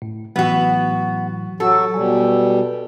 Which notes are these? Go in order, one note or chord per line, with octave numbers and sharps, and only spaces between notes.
A2
A2 E3 F#3 B3 F#4
F#3 F#4 A4
B2 G3 G#5